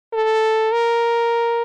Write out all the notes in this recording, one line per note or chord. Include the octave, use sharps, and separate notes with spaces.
A4
A#4